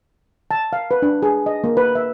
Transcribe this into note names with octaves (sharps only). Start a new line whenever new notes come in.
A5
F5
B4
D4
G#4
D#5
A#3
B4
E5